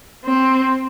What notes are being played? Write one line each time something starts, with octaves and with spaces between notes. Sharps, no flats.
C4